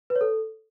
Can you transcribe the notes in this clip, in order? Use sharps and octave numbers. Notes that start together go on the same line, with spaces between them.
B4
C#5
A4